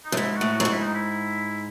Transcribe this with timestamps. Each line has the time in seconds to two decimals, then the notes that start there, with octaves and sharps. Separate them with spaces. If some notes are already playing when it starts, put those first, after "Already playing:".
0.05 D#4
0.12 F#2
0.17 G#2 E4
0.35 F#4
0.41 A2
0.53 F#4
0.60 F#2
0.65 G#2
0.71 E4
0.83 D#4
0.94 E4